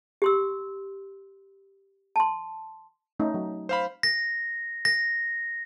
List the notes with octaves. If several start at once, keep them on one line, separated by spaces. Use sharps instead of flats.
G4 C6 E6
A5 C6
A3 C#4 D#4
F#3
C5 F5 B5
A#6
A#6